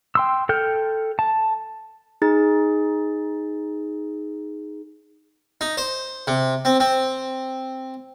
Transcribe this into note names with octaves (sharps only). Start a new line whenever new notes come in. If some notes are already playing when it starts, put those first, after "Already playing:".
G5 C6 E6
A4 G5 F6 G6
A5
D#4 G#4 A6
D#4
C5
C3
C4
C4